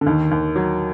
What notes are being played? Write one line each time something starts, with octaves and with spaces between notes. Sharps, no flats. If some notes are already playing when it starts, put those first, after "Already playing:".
D3
D#2 D#3
D#2
F#3